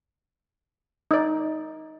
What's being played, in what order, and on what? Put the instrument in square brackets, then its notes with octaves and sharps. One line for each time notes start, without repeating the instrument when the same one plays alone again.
[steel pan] D#4 D5